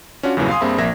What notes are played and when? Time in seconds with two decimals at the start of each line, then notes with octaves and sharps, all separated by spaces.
0.23 C#4 D4 F4 F#4
0.37 E2 G2 A#2 C#3 E3 F#3
0.49 F5 G#5 C6 D#6
0.61 G2 A#3 C4 G#4 E5 B5
0.78 A#1 A#3 E5 G#6 A#6